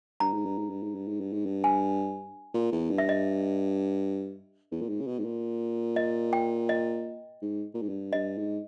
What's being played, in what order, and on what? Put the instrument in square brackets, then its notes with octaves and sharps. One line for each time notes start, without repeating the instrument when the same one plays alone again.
[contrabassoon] G2 [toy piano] A#5
[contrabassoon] G#2
G2
G#2
G2
G#2
G2
G#2
G2
G#2
G2
[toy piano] G#5
[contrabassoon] A#2
E2
G2
[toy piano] E5
D#5
[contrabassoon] E2
A#2
G#2
C#3
B2
G#2
A#2
[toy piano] D#5
G5
D#5
[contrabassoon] G#2
A#2
G#2
G2
[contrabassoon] G2 [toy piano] D#5
[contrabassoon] G#2